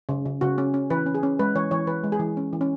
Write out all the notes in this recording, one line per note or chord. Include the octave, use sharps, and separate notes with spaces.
C#3
C#3
C#3 F#4
C#4
C#4
E3 B4
C#4
G#4
C#4
G#3 B4
E3 C#5
E3 C#5
E3 B4
G#3
G#4
E3
C#4
E3
C#4